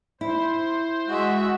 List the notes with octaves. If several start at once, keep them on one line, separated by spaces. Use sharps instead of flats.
E4 C5
G#3 F#4 E5